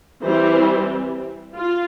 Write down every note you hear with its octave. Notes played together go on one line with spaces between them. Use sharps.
E3 G3 C4 C5
F4